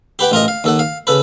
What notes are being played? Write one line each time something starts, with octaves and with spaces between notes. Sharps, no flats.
G4 B4 F#5 G5
A1 F4 A#4 D#5
F5
D#2 A4 F#5
F5
C#3 A4 B4